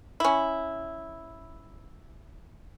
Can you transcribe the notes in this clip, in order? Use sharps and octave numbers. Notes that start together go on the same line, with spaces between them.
C#4 E4